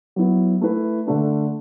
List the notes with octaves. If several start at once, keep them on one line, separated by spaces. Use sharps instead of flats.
F#3 B3 E4
A3 E4 B4
D3 A3 D4